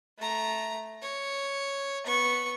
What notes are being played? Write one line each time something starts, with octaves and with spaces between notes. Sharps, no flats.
A3 A#5
C#5
B3 C#6